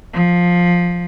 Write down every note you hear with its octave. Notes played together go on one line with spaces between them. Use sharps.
F3